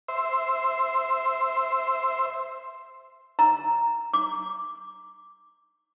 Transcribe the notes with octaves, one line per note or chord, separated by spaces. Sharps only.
C5 E5
A#5
D6